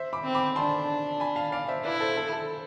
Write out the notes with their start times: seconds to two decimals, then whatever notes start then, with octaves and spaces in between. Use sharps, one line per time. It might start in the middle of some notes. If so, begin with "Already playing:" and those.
Already playing: C5 E5
0.13 B5 D6
0.24 C4
0.35 B5 D6
0.56 D4 A5 C6
1.20 G#5 B5
1.36 F5 A5
1.52 D5 F5
1.68 C5 E5
1.84 E4 B4 D5
2.00 A4 C5
2.17 A4
2.33 A4